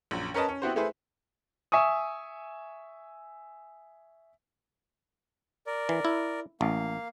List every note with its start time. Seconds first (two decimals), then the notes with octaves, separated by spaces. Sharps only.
0.11 A#1 F#2
0.34 C#4 A#4 B4 D#5 A5
0.49 C#4
0.62 B3 C4 E4 F#4 G4 C5
0.76 A3 E4 G#4 B4 C5
1.72 E5 G#5 C#6 D#6
5.67 A#4 D5
5.89 E3
6.05 E4
6.61 A1 A#3 F5